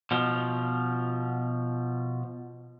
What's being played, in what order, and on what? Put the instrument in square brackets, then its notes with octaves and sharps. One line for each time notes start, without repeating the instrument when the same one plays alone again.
[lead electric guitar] B2 F3